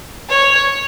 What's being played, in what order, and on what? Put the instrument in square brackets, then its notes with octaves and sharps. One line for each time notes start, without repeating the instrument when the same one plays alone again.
[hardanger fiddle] C#5